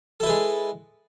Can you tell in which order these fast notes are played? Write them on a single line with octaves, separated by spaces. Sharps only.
A4 E4 B4 G#3